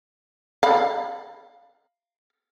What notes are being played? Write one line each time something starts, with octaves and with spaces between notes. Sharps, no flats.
F5 B5